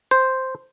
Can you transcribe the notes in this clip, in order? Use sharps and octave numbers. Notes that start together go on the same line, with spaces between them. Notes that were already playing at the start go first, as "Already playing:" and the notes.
C5